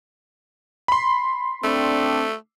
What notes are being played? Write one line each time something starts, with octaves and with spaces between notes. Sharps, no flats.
B5 C6
A3 C4 D4